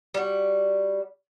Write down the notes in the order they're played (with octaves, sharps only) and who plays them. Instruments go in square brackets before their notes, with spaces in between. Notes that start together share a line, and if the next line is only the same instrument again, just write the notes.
[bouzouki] G3 F#4